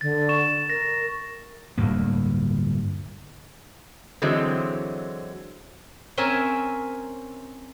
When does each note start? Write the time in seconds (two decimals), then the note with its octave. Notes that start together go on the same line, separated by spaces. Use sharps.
0.01 D3 A6
0.29 C#6 E7
0.70 A#4 A#6
1.78 D1 D2 G2 A#3
4.22 D3 E3 F#3 G#3 C4
6.17 C4 C#4 A#4 E5 G#5